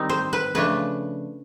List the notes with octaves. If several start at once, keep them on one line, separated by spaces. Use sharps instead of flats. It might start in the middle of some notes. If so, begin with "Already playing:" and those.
Already playing: D#3 G3 C4 D#4
C5
B4
C#3 F3 A3 D4 B4